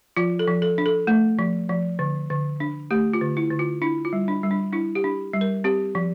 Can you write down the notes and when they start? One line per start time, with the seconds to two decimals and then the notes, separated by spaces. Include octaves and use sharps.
0.17 F3 F4
0.39 A4
0.47 F3
0.62 A4
0.78 D4
0.86 A4
1.07 A3
1.39 F3
1.69 F3
1.99 D3
2.30 D3
2.60 D4
2.91 A3 G4
3.13 F4
3.21 D3
3.37 E4
3.51 D3
3.59 F4
3.82 D4 E4
4.05 F4
4.13 G3
4.28 D4
4.43 G3
4.51 D4
4.73 D4 E4
4.95 G4
5.04 D4
5.33 G3
5.41 A#4
5.64 C4 G4
5.95 F3